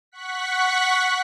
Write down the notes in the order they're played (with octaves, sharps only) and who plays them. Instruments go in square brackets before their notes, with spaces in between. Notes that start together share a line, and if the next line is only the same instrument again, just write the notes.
[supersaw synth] F#5 C#6 F#6 B6